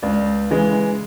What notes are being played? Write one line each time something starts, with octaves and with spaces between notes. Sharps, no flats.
C#2 D5
C#3 E3 G#3